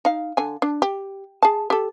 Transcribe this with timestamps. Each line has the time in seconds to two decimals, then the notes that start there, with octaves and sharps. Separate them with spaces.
0.05 D#4 F5
0.37 D3 G#5
0.62 D4
0.82 G4
1.42 G#4 A5
1.70 G4 A4